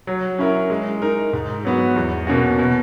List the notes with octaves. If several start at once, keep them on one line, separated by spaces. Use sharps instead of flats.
F#3
C#4 E4 A#4
G#3
D#4 A#4
G#2
F#3 B3 F#4
E2
B2 A#3 C#4 F#4
B2